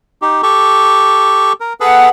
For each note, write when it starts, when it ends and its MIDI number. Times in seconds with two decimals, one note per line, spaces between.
0.22 0.41 63
0.22 0.41 67
0.43 1.53 67
0.43 1.53 69
0.43 1.53 85
1.60 1.73 70
1.80 2.09 68
1.80 2.09 69
1.80 2.09 71
1.80 2.09 78